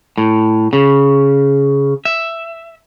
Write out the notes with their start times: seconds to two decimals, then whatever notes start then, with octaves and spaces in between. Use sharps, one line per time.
0.18 A2
0.73 C#3
2.05 E5